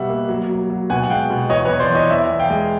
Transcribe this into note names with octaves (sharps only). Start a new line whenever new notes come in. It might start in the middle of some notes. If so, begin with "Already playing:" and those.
Already playing: B2 G3 E5 F#5
A#3
F#3
F#3
F#3
B2 F#5 G#5
F#5
G#3 F5 G5
B2
E2 C#5 D#5
B4 C#5
E2
C5 D5
E3
C#5 D#5
E2 D5 E5
E2
F5 G5
G#3